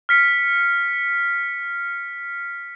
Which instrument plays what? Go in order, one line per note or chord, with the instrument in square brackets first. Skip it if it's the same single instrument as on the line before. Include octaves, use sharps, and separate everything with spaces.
[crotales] F6 B6 C#7